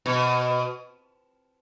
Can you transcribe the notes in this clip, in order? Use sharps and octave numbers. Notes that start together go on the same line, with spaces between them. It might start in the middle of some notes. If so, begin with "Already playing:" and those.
B2